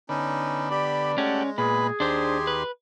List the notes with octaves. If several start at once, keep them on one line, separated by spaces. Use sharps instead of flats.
D3 B3 C#4 D#4
G4 D5 B5
G#3 A3 C#4 G4 F#5
A#2 B3 G#4 B4
D#2 D4 G4 C5 C6
B4